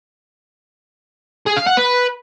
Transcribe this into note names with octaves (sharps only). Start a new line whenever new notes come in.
G#4
F5
F#5
B4